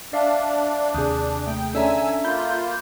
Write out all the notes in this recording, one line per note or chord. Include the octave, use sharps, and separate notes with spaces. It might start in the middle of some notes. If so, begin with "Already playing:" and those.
D4 D5 E5 F5
D#2 C3 G#4 D#6 F#6 G6
A3 G5 D#6
D3 C#4 D4 A4 E5 G#5 A#5 E6
A#3 F4 B5 G6